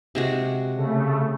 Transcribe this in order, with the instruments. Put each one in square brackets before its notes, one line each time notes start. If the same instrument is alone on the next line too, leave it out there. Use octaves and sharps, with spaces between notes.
[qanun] C3 G#3 F#4
[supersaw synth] C#3 A3